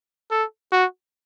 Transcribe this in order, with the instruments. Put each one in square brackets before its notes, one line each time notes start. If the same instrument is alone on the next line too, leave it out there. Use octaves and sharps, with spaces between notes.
[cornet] A4
F#4